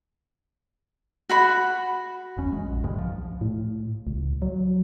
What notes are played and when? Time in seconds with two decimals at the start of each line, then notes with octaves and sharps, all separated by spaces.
1.29 F#4 F#5 B5
2.37 F#1 E2 C#4
2.52 G#3
2.65 A#1
2.83 D2 G2 G#3
2.96 C2 F3
3.41 A2
4.07 C#2
4.42 F#3